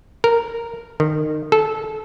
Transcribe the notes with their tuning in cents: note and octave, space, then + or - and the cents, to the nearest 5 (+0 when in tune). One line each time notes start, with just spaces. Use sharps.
A#4 -10
D#3 -25
A4 -20